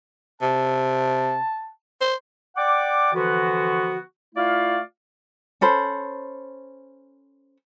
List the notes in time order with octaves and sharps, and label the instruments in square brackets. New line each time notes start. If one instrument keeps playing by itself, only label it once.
[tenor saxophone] C3 [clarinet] A5
[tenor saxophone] C5
[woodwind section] D5 F#5 G5 D6
D3 E3 F3 B3 F#4
A3 E4 F4 D5 F5
[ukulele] C#4 A4 C5 B5